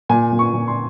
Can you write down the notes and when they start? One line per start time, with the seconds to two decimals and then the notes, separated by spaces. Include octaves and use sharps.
0.09 A#2 G#5
0.32 A#2
0.39 C#6
0.53 A#2
0.68 C6